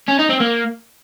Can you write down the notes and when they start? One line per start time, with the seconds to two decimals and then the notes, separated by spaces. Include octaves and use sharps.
0.08 C#4
0.19 D#4
0.29 C4
0.40 A#3